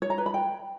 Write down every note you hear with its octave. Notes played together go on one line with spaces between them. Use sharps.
C#5
A#5
B4
B5
G5